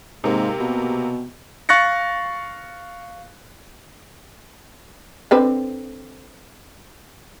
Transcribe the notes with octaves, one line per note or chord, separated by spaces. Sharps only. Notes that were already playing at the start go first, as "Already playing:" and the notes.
G#2 C3 A#3
B2
F5 C#6 F#6 A6 A#6 C#7
D3 C4 B4